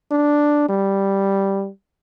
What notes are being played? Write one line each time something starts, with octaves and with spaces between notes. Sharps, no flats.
D4
G3